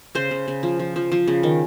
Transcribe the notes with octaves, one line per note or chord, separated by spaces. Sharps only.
C#3 C5
C#3
C#3
F3
F3
F3
F3
C#3
D#3